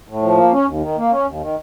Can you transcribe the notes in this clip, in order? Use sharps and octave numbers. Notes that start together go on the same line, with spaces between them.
A2
F3
A#3
C#4
D#2
D#3
A#3
C#4
D#2
D#3